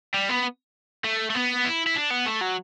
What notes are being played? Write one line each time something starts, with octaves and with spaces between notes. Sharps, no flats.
G3
B3
A3
A3
B3
E4
E4
D4
B3
A3
F#3